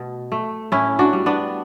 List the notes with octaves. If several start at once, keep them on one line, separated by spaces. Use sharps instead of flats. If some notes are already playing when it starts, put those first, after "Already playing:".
Already playing: B2 A3
A3
A2 C#4 E4
D4 F#4
G3
B3 D4